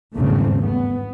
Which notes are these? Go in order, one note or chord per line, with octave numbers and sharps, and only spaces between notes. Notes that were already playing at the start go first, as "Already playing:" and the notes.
G#1 E2 G2 C#3 A3 C4
B3